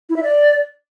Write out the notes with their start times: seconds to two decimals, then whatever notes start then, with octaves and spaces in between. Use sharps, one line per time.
0.09 E4
0.16 E5
0.23 D5